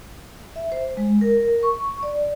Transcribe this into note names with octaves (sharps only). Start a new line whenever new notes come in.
E5
C5
G#3
A#4
C#6
D5